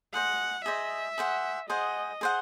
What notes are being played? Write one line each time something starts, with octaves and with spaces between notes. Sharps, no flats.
G#4 C5 D#5 F#5
G#4 C5 D#5 E5
G#4 C5 F#5
G#4 C5 D#5 F#5
G#4 C5 F#5